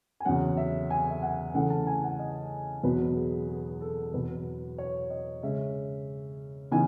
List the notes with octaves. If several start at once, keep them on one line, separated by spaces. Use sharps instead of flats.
G#5
E2 C#3 F#3 C#4 F#5
E5
G#5
E5
F#5
C#3 E3 A3 C#4 F#5
A5
G#5
F#5
D#5
E2 B2 F#3 B3 B4
G#4
G#4
A4
E2 B2 F#3 B4
C#5
D#5
C#3 G#3 C#4 E5
C#3 E3 B3 D#4 G#5